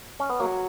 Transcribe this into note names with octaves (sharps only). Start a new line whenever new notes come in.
C#4
B3
F#3 A#3